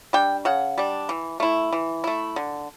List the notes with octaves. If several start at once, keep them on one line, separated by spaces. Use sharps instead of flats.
G3 D4 G5
C#3 F#5
G3 D4
E3
A3 E4
E3
A3 E4
D3